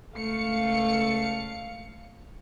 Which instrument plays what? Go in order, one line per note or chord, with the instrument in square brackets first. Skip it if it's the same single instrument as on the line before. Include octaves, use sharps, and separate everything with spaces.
[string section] C#2 A3 F5 C#7